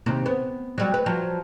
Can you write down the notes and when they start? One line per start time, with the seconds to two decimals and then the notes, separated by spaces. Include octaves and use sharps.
0.06 D#2 C3
0.26 B3
0.78 F#3 G3
0.94 B4
1.06 F3 F#3